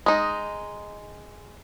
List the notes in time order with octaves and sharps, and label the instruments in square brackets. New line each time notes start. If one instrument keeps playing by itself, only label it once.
[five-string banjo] G#3 D#4